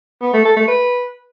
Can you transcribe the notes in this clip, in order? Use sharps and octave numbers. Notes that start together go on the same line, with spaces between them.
B3
A3
A4
A3
B4